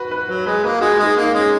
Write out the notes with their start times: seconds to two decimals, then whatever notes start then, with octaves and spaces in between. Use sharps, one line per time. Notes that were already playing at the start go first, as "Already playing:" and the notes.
Already playing: F#4 B4
0.11 B4
0.28 F#3 B4
0.46 G#3 B4
0.64 A#3 B4
0.81 G#3 F#4
0.99 G#3 D#4
1.17 A#3 D#4
1.34 G#3 C#4